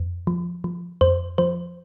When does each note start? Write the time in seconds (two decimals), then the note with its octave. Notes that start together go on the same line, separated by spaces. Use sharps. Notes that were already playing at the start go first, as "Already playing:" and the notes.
Already playing: F2
0.27 F3
0.64 F3
1.01 F2 C5
1.38 F3 C5